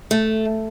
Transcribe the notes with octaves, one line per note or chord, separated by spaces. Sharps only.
A3